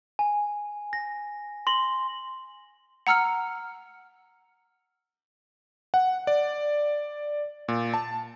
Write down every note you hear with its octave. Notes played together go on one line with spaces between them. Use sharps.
G#5
A#6
C6 A#6 F#7
F#5 A#5 E6 F6 C#7
F#5
D5
A#2
A5